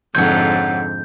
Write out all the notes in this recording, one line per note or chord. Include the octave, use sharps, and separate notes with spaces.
F2 G#2 D3 C#5 F#5 G6